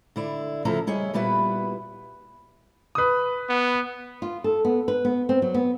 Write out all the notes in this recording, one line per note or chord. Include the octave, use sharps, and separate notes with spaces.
D3 E4 D5
D2 C#3 F3 E4 A4 A#5
G3 E4 G#4 C#5 D#5
A#2 G3 B3 E4 F#4 B4
B4 D#6
B3
F4
A4
B3
B4
B3
C4
F#3
B3